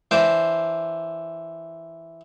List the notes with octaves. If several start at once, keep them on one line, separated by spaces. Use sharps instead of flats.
E3 D4 C5 D6